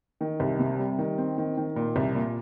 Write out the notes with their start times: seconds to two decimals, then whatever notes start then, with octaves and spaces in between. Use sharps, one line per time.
0.21 D#3
0.40 C2
0.59 C3
0.79 G3
0.99 D#3
1.18 C4
1.38 D#3
1.57 D#3
1.76 A#2
1.96 C2
2.15 A#2